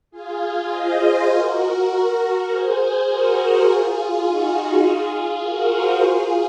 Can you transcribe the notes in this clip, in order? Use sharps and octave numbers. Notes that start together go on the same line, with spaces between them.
F4 G#4
C5 D#5
F#4 A#4
G#4 C5
F#4 A#4
F4 G#4
D#4 F#4
F4 G#4
F4 G#4
F#4 A#4
G#4 C5
F4 G#4